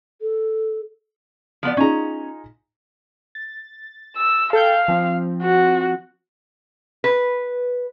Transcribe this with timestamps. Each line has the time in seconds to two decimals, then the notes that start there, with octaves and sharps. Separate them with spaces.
0.22 A4
1.63 F3 B3 D5
1.77 C#4 D#4 F4 G#4 A#5
3.35 A6
4.17 E6
4.53 A4 F5 G5 G6
4.88 F3 C4
5.42 F#4
7.04 B4